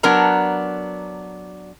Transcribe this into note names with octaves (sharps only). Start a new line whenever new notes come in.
F#3 B3 D4 A#4 A5 A#5